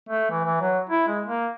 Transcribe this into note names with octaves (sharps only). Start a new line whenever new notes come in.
A3
E3
E3
F#3
E4
G#3
A#3